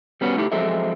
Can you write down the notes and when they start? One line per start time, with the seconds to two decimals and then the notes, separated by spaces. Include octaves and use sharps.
0.21 G3 B3 C#4 F#4
0.37 A3 D#4 E4 G4 A4
0.52 F3 F#3 G#3 C4 A4 E5